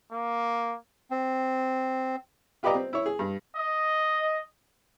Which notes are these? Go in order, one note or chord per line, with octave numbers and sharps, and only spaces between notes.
A#3
C4
F4 G4 B4 D5 D#5 A#5
C4
E4 C#5
G#4
G2
D#5